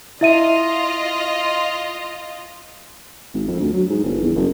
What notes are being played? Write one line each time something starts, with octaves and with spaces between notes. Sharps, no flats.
E4 F4 D#5 E5 D#7
G#1
F2
D2
F#3
G#2
G1
E2
F#1